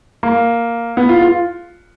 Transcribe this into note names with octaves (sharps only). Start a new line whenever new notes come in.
A#3
B3
F4
F4